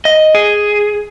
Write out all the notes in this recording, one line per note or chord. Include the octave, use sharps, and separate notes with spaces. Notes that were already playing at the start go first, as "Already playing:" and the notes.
D#5
G#4